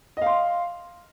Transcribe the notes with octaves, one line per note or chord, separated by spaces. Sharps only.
D#5 F5 C6